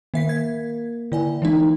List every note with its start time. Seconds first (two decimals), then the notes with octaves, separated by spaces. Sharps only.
0.14 D#3 A#3 E5 B6
0.29 G#6
1.12 D3 E4 D5 G#5
1.42 E3 G#3 D#4